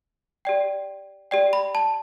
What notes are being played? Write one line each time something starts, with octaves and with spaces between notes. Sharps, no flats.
G4 D5 G5
G4 D5 G5
B5
A5